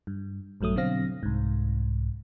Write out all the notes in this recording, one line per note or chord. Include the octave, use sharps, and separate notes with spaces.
G2
A#1 G2 F#3 A3 D#6
B2 D3 F#3 C4 F5 A#6
C2 G#2